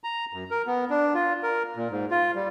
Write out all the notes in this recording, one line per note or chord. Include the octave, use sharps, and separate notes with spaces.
A#5
F#2
A#4
B3
D4
F4
A#4
A#2
G#2
F4
G3